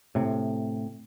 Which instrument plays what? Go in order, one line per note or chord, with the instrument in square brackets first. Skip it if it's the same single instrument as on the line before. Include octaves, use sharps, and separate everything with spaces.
[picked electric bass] A2 C3